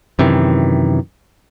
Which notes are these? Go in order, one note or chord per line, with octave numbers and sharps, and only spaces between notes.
F#2 C3 D#3 E3